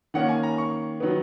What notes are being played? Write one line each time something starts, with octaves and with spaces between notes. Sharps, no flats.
D#3 A#3 C#4 F#5
G#5
A#5
C#6
D#3 F#3 B3